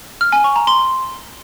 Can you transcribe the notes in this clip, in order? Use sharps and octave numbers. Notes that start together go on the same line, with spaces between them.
F6
G#5
C#6
A#5
C6